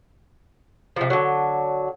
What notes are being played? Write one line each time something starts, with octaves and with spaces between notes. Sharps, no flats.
C3 F3
D3 F#3